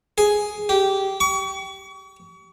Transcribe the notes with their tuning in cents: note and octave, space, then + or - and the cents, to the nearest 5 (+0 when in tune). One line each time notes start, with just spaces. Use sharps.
G#4 +5
G4 -15
C#6 +40